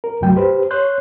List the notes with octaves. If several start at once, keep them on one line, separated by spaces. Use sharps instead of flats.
A#4
C#2 G2 C3 F#3 A3 G5
G4 B4 C5
C#5 C6 F#6 G6